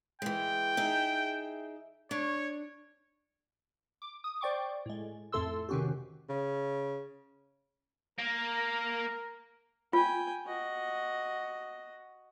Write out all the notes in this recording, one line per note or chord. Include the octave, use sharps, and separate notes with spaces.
E3 G#3 G5
D#4 G#4 E5
D4 C#5
D6
D#6
C5 D5 G5 C#6 D6
A2 G#3
F2 A2 A3 A4 C6 E6
C3 D#3 C#4 F#4 G4
C#3
A#3 A#4
F4 G5 G#5
F#4 D#5